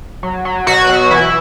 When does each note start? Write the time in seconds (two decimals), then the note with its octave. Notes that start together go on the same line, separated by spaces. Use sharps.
0.23 F#3
0.45 F#3
0.67 B2 F#3 F#4
0.89 B2
1.11 E3 E4